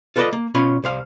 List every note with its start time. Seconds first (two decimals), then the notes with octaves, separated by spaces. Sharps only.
0.16 F4 A4 B4 C5 D5 D#5
0.33 A#3
0.54 B2 C#4 F4 C#5 B5
0.84 C2 C5 F5